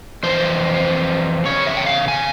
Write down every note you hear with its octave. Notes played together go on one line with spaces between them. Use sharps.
F2 E3 C4 C5
E2 C#3 C#5
E5
G5
F5
G#5